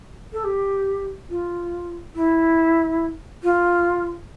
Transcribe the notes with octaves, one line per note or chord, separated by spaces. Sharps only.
A4
G4
F4
E4
F4